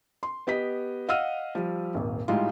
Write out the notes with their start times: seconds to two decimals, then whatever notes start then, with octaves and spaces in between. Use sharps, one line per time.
0.23 C6
0.47 B3 G4 D#5 B6
1.09 D#5 F5 F#5 E6 F6 D#7
1.55 F3 G3
1.94 D#1 G#1
2.28 A2 G3 G#3 D#4 F4